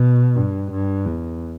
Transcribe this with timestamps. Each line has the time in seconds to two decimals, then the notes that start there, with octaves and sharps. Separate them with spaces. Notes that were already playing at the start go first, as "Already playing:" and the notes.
Already playing: B2
0.36 G2
0.71 G2
1.06 E2